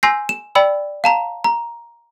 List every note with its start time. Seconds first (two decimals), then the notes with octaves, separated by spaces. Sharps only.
0.03 G#5 C6 E6 G6 A#6 C7
0.29 E7
0.55 D5 G5 B5 E6
1.04 F5 A5 A#5
1.44 A#5